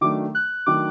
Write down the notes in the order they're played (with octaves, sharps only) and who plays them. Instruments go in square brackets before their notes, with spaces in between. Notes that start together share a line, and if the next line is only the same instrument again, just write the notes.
[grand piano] D#3 F#3 A3 D4 [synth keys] D6
[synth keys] F#6
[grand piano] D#3 F#3 A3 D4 [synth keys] D6